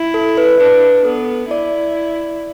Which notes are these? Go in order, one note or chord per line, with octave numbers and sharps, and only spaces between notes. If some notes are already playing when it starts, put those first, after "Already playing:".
Already playing: E4
A4
B4
D4 B4
B3 A4
E4 D5